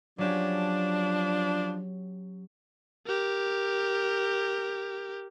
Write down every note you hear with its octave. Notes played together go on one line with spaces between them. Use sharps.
F3 F#3 C#4 D4 G4
G4 A#4